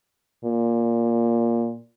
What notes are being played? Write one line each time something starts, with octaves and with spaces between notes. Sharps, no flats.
A#2